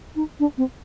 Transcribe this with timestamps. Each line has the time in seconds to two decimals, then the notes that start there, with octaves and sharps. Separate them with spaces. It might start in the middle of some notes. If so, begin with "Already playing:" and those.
0.16 D#4
0.40 D4
0.58 C4